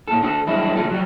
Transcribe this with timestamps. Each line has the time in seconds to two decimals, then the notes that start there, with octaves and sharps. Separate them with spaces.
0.08 A#2 A4
0.22 D3 F#4 G#4 A4
0.47 G2 F#3 G#3 D4 E4
0.76 A2 C#3 G#3 F4 G#4 A4
0.90 F#3 G3